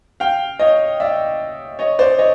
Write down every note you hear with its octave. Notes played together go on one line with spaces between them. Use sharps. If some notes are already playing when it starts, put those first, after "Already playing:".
F5 G5
C#5 D#5
D5 E5
C#5 D#5
C5 D5
C#5 D#5